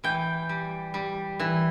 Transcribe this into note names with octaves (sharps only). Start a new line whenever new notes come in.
E3 G5
G3
G3
E3